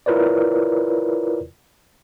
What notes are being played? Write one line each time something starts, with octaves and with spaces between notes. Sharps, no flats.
E4 F4 A#4 B4 C#5 D5